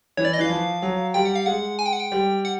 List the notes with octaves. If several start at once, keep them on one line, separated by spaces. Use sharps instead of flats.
E3 C#5
D5
D#5
E3 F5
F3
F#3
G3 G5
F#5
F5
G#3 F#5
G#5
G5
F#5
G5
G3
F#5